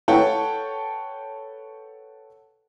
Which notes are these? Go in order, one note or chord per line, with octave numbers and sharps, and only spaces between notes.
A4 B4 C#5 F#5 G5 A5